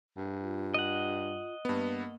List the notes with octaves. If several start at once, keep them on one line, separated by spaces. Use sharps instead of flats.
G2
F4
D#5 F#5
G2 A#3 B3